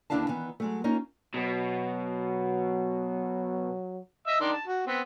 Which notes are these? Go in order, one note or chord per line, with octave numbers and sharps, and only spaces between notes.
D#2 D3 D4 E4 F5 A5
D#3 E3 B3
F#3 G#3 A3
A#3 C#4 D#4 F4
B2 F#3
D#5 E5 E6
D#3 D4 C6
A5
F#4
B3 C4